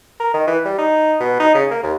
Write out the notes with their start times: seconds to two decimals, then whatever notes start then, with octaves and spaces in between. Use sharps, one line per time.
0.20 A#4
0.33 D#3
0.47 E3
0.65 G3
0.78 D#4
1.20 B2
1.40 D#4
1.54 C#3
1.71 A#3
1.83 D#2